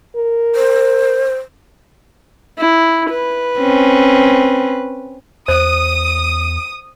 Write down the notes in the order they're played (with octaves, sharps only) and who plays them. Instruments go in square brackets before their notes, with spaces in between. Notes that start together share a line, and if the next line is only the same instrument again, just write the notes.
[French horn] A#4
[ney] C5
[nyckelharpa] E4
B4
[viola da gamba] C4 C#4
[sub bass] E2 [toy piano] C5 [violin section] D#6